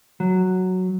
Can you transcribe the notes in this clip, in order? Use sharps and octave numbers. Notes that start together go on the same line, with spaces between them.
F#3